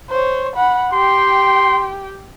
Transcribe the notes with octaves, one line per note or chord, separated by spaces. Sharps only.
C5 C#5
F#5 B5
G4 G5 C6